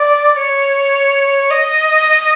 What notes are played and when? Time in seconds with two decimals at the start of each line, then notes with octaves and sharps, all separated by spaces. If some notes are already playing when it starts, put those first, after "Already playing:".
Already playing: D5
0.33 D5
0.37 C#5
1.51 D#5